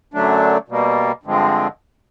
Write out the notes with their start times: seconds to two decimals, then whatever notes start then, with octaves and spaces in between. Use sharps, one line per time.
0.14 F#2 D3 F#3 A3 D4
0.68 B2 G3 A#3
1.23 G2 D3 F3 G#3 C4